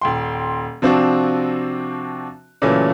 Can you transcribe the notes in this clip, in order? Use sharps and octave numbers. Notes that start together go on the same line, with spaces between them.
D#1 G5 C6
C3 F3 C4 D4 F#4
A#2 C#3 E3 F#3 A3